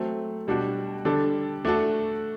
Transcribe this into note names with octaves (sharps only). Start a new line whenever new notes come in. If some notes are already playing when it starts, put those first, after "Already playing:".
Already playing: F#3 A3 C4
B2 G3 D4 F#4
D3 G3 D4 A4
A3 D4 F#4 A4